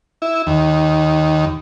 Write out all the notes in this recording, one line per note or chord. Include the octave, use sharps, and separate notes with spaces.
E4
D#2